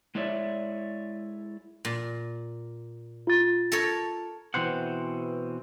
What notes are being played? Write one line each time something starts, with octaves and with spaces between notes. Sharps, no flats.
G#3 E4 C#5 D5 E5
A#2
F4 A6
A4 A#4 C#5
B2 E3 C4 C5 F#5